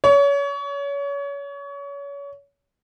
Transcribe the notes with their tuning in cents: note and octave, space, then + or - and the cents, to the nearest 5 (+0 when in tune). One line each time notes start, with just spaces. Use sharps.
C#5 +30